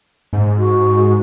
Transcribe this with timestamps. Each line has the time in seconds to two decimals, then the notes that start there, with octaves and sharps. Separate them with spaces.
0.33 G#2
0.58 F#4